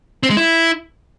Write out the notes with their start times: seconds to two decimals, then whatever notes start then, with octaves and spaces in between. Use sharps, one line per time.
0.23 C4
0.30 G#3
0.37 E4